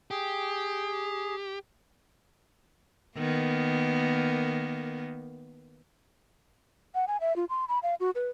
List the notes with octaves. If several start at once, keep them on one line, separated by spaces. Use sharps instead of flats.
G4 G#4
D#3 A#3 B3
F#5
G#5
E5
F4
C6
B5
F5
F#4
B4